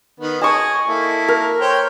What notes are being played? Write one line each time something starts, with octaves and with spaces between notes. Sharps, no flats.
D#3 B3
G#4 D#5 A5 C#6
A#3 E4 A4
A#4
C5 C#5 G5